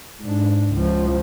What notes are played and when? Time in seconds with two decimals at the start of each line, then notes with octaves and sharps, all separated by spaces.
0.21 G#2 D4
0.73 C#2 F3